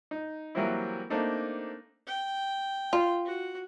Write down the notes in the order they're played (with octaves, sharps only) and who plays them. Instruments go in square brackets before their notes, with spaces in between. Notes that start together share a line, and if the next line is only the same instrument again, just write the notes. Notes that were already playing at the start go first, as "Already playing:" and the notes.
[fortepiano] D#4
E3 F#3 G3 A#3 C4 E4
A3 A#3 C4 D4 D#4 A4
[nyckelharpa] G5
[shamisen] F4
[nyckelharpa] F#4